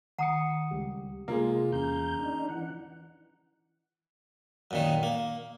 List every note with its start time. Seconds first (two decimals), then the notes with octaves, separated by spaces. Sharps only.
0.18 D#3 F#5 A#5 D#6 C#7
0.71 C#2 G3 G4
1.28 C3 G#3 A#3 F4
1.72 E2 C#4 A#5 G6
2.19 D4 D#4
2.49 E3 F#5
4.71 F#2 A#2 D#3
5.03 A#3